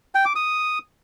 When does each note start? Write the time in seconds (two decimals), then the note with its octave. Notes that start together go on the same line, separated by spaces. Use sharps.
0.15 G5
0.25 D6
0.36 D#6